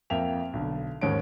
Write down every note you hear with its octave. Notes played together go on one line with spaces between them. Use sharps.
F2 A#3 E5 G5 F7
B1 D3
D#2 G#2 C#4 A#4 D7